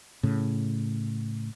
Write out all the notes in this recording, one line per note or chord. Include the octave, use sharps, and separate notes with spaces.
A2 C#3